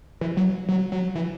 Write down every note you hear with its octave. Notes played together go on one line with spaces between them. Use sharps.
E3
F#3
F#3
F#3
E3